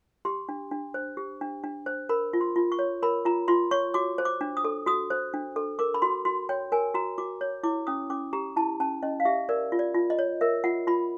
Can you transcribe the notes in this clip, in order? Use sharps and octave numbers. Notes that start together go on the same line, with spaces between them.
G4 C6
D4
D4
C5
G4
D4
D4
C5
A#4 B5
F4
C6
F4
C#6
C#5
A#4 B5
F4 A#5
F4 C6
C#5 C#6
F#4 D6
C5
D6
D4
D#6
A4
F#4 D#6
C5
D4
A4
A#4 D6
B5
F#4 C6
F#4 C6
C#5 G5
A#4 G#5
F#4 A#5
F#4 D6
C#5
E4 D6
C#4 D#6
C#4 D6
G4 A#5
E4 A5
C#4 A5
C#4 D#5
F5
G4 E5
A#4 D5
F4
D5
F4
D#5
C#5
A#4 E5
F4 F#5
F4 B5